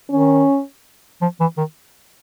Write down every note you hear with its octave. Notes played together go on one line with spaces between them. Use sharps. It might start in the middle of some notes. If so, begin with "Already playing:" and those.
D#3 C#4
F3
E3
D#3